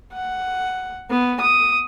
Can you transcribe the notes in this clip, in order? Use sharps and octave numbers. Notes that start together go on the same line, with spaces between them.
F#5
B3
D#6